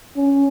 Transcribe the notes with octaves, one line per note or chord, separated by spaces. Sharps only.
C#4